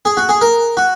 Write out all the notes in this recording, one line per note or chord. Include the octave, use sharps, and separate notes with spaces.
G#4
F#4
G#4
A#4
F#4